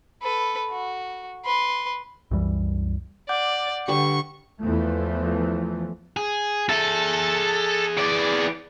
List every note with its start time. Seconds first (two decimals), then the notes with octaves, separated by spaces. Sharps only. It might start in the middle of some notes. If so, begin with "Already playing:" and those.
0.22 A4 B4
0.70 F#4
1.45 B4 C6
2.31 C2 F#2 E3 G3
3.29 D5 F#5 D6 G6
3.88 D3 G3 B4 C#6
4.62 E2 E3 F3 A3
6.17 G#4
6.69 G#4 A4 E5
7.98 E3 D5